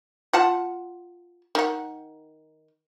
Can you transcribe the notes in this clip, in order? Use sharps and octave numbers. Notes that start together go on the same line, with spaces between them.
F4 F#5 A5
D#3 F#5